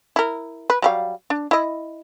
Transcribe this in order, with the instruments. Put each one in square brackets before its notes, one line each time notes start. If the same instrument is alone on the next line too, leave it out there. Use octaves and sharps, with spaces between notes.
[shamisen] E4 A#4
B4
F#3 G3 F5
D4
E4 D#5